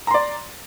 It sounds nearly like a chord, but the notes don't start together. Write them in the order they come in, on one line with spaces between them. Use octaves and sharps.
A#5 C6 D5